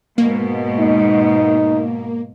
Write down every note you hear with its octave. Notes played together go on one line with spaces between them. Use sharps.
G#2 B2 A#3
D#4